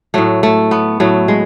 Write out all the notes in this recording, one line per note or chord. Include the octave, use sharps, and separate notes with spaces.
A2 F#3 A3
A3
B3
A2 F#3 A3
G#3